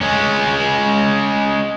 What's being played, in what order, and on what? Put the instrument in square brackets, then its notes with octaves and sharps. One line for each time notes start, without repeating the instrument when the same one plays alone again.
[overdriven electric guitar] G#3 C#4